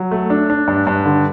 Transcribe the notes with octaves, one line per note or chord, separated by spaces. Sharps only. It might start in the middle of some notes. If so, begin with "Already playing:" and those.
Already playing: F#3
A3
D4
D4
G2
G2
D3